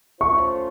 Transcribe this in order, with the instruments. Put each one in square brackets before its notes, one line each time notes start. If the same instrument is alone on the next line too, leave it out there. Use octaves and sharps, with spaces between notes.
[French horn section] A3 C#4 F4 C5 [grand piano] C#6